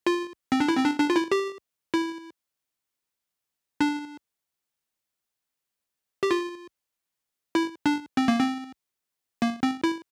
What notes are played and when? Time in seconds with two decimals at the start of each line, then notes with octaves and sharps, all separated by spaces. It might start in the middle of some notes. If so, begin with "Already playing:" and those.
0.07 F4
0.52 C4
0.60 D4
0.69 E4
0.77 C4
0.85 D4
1.00 D4
1.10 F4
1.16 E4
1.32 G4
1.94 E4
3.81 D4
6.23 G4
6.31 F4
7.55 E4
7.86 D4
8.17 C4
8.28 A#3
8.39 C4
9.42 A#3
9.63 C4
9.84 E4